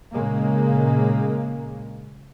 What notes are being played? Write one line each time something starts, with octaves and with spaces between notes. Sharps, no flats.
A#2 C#3 G#3 A#3